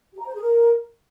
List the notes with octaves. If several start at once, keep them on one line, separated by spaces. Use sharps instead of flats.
G4
A#5
C5
G#4
A#4